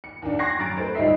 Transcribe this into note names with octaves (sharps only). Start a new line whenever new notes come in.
C#7
D#2 D4
C#6 D6 F#6 G#6 A#6 C7
F#2 A#5 A6 D7
A3 B4 C5 D7
C#2 G3 D#4 D#5 E5 C7